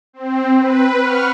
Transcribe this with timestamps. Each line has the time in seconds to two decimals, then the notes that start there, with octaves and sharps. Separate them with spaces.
0.13 C4
0.57 B4
1.00 F#5 C#6 F6